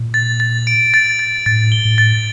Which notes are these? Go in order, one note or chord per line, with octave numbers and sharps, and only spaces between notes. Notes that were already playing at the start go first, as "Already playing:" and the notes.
Already playing: A#2
A6
A6
D7
A6
A6
A2 A6
G7
A2
A6